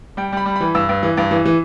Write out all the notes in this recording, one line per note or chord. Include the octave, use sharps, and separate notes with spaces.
G3 G5
G3
B5
G3
E3 B5
G2 E6
G2
E3
G2
E3
E3